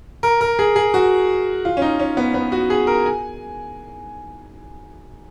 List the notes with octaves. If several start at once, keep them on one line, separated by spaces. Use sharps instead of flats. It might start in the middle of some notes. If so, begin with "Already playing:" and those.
A#4
A#4
G#4
G#4
F#4
F4
C#4
D#4
C#4
B3
B3
F#4
G#4
A#4
G#5